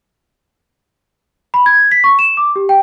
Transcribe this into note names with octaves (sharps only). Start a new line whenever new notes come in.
B5
G#6
B6
C#6
E7
D6
G4
G5